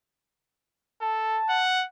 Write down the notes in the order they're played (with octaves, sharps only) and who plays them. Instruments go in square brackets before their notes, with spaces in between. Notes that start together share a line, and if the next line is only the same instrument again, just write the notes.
[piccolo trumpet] A4 [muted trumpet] A5
[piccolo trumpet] F#5